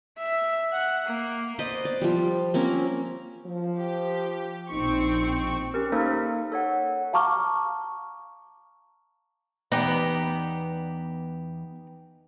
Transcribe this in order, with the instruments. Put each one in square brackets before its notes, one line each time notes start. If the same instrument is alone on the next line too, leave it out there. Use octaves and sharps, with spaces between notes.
[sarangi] E5
F#5
A#3
[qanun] B4 C5 D5 D#5
D5
F3 G3
A#3 C4 C#4 A#4
[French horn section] F3
[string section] G4
[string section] A#1 C4 C#6 [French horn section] D#4
[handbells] C#4 G4 A#4
A#3 D#4 A4 C5
A4 C#5 F#5
[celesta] F5 A5 A#5 C#6 D6 F6
[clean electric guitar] E2 D5 [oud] B3 [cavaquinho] D#4 G4